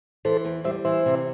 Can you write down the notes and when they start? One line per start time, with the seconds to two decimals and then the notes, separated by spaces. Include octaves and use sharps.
0.25 E3 A4 C5
0.45 E2
0.65 G3 C5 E5
0.85 E3 C5 E5
1.06 C3